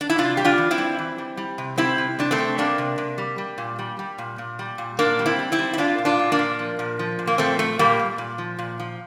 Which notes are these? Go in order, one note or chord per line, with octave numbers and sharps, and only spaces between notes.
D4
E4
C3 D4 F4
G3 G4
D4 F4
E3
C4 E4
G3
E3
G3
G3
C3
G3 C4 E4
C3
C3 D4
A3 C4
C3
G3 A#3 D4
C3
C3
G3
G3
A#2
G3
G3
A#2
A#2
G3
A#2
A#2 A#3 D4
G3
C4 E4
G3
C4 E4
G3
E4
G3 D4 F4
A#2
D4 F4
A#2
A#3 D4
A#2
F3
A#2
F3
A#2
A#3
F3 A3 C4
A#2 A3
A#2 G3 A#3
A#2
A#2
F3
A#2
F3